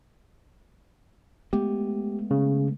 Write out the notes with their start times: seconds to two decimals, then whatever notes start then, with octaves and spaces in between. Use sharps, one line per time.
1.53 G#3 A3 B3 G4
2.31 C#3